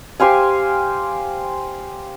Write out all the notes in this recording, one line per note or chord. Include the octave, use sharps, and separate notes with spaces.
G4 C5 F5 G#5